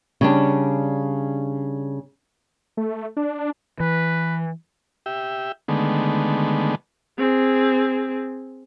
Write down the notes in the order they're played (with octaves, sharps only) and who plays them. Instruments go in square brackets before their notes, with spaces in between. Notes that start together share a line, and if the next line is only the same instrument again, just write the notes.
[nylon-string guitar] C#3 G3 D4
[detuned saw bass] A3
D4
[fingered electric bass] E3 [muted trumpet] B4
[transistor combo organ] G4 E5
D3 D#3 G#3 A3 B3
[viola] C4 G#4